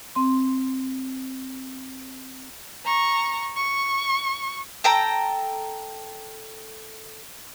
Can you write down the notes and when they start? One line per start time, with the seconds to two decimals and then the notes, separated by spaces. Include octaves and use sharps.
0.15 C4 C6
2.85 A#5 C#6
3.56 C#6
4.84 A4 G5 A#5